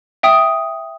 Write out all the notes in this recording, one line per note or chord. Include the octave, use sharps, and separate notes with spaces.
E5 G5 D#6